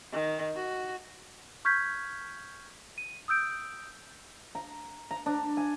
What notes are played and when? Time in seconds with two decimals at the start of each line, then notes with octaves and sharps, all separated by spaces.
0.12 D#3
0.56 F#4
1.65 C#6 F6 G6 G#6 B6
2.98 D#7
3.28 D#6 E6 G6 D7
4.55 A#5
5.11 A#5
5.26 D4
5.57 G#5